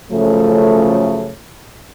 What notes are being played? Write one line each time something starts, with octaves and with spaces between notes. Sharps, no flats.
F#2 C#3 F3 A3